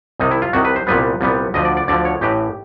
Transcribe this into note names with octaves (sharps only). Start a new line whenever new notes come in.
C2 C3 D#3 D#4
E4
F4
C2 C3 D#3 F#4
B4
C5
C2 A#2 G3 B3 B4
C2 A#2 G3 B3
D2 D3 F3 D#5
D5
D5
D2 D3 F3 D5
C#5
A1 A2 E3 G4